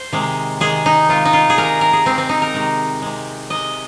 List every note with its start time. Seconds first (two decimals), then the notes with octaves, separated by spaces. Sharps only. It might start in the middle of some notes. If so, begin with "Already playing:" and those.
Already playing: C5
0.13 C3 D#3 G#3
0.60 C3 D#3 G#3 G#4
0.86 D#4
1.09 C3 D#3 G#3 F4
1.25 D#4
1.33 F4
1.50 G#4
1.57 C3 D#3 G#3 A#4
1.81 A#4
1.93 G#4
2.06 C3 D#3 G#3 C4
2.18 C4
2.29 D#4
2.42 A#4
2.54 C3 D#3 G#3
3.02 C3 G#3
3.50 C3 G#3 D#5